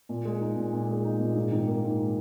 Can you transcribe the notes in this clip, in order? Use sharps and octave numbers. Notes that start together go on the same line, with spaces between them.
A#2
G#3
D#4
A#2
A#2
G#3
D#4
A#2
G#2
D#3
A#3
G#2